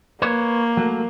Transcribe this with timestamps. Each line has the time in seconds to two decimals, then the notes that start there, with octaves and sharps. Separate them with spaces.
0.22 A#3 B4 C#5
0.77 F#3 A3